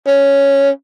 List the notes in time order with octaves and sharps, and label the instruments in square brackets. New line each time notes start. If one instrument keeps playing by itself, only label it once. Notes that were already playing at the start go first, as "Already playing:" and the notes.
[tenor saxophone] C#4